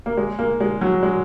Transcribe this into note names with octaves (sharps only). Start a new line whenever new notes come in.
A#3
G#3
A#3
G#3
F#3
G#3